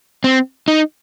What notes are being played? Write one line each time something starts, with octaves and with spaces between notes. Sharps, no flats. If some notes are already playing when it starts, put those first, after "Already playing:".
C4
D#4